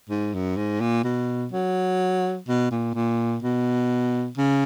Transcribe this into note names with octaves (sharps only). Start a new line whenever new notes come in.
G#2
F#2
G#2
A#2
B2
F#3
B2
A#2
A#2
B2
C#3